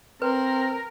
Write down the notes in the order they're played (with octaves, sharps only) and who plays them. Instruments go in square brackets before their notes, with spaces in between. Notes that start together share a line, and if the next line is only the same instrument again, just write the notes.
[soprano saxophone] C4 [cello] A#4 [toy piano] B4